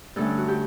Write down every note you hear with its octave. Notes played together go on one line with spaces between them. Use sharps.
G2 D3 A3 C#4 A4
F#4
G4